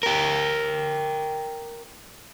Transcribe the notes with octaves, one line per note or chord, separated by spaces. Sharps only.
G4 A#4